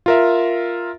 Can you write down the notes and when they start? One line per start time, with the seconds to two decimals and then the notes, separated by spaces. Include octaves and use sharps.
0.06 F4 A#4 E5